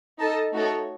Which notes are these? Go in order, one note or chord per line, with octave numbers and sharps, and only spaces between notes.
D#4 A4 D#5 A5
A3 D#4 F#4 A4 C#5